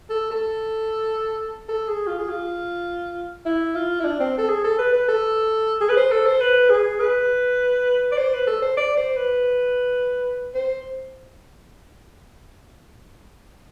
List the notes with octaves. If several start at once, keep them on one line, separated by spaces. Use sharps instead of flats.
A4
A4
A4
G#4
F4
G#4
F4
E4
F4
E4
D4
C4
A4
G#4
A4
B4
B4
A4
G#4
B4
C5
A4
C5
B4
G#4
B4
D5
C5
B4
A4
C5
D5
C5
B4
C5